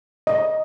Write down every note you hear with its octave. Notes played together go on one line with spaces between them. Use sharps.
D#5